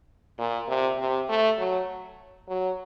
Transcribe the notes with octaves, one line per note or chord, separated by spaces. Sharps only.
A#2
C3
C3
A3
F#3
F#3